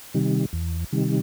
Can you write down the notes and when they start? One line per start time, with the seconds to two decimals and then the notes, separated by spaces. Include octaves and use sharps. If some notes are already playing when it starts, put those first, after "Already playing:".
0.14 C3 D#3 G3
0.53 E2
0.92 C3 D#3 G3